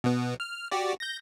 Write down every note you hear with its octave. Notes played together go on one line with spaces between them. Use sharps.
B2 B3
F6
F#4 G4 D5
G6 A#6